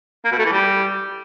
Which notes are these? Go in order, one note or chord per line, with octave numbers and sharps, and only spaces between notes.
A#3
B2
A3
E3
G3